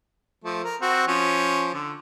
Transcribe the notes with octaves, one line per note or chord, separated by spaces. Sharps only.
F3 A3
A#4
C4 F#4
F3 C#4
D3